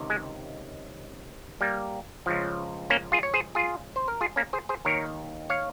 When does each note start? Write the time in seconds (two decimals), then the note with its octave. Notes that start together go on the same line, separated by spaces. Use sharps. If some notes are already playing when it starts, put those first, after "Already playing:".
Already playing: C#2 C3 D#3
0.10 G#3
1.61 G3 A#3
2.26 C#2 C#3 F3
2.90 A#3 C#4
3.12 F4 G#4
3.23 C#5
3.34 G#4 C5
3.55 F4 G#4
3.96 C5
4.08 A#4
4.21 F4 G#4
4.36 A#3 C#4
4.53 G#4 C5
4.69 G#4 C5
4.85 D#2 D#3 A#4 C#5
5.50 C#5 F5